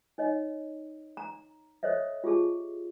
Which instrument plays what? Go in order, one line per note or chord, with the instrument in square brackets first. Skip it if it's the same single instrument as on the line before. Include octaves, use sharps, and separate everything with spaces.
[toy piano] D#4 C#5 D#5
A#5
A4 C5 C#5 D#5 E5
F4 G4 G#4 A5